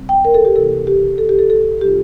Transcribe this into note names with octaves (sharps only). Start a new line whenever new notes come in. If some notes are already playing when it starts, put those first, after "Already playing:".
Already playing: C3 G3 C4
G5
A#4
A4
G4
C3 E3 A#3 E4 A4
G4
A4
G4
A4
A4
C3 G3 D4 F4 G4